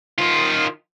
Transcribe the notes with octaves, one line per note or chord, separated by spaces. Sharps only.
D#3 F4